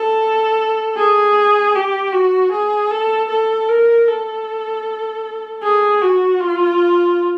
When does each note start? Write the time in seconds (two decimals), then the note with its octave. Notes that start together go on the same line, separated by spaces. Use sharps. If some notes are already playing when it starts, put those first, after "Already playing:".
Already playing: A4
0.97 G#4
1.75 G4
2.12 F#4
2.52 G#4
2.91 A4
3.29 A4
3.69 A#4
4.08 A4
5.63 G#4
6.02 F#4
6.41 F4